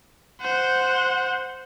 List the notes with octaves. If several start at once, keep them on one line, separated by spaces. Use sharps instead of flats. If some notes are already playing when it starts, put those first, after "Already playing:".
C5 F#5